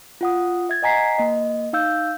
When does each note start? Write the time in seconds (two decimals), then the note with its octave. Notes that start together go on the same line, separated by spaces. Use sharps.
0.21 F4 F#5 D#6
0.69 E5 G#6 A6
0.83 D#5 F#5 G#5 A#5 B6 C7
1.18 A#3 D#5
1.73 D#4 F5 E6 G6